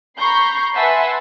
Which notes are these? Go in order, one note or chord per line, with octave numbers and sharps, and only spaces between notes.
A#5 B5 C#6 G6 C7
B4 E5 F#5 G#5 A5 C6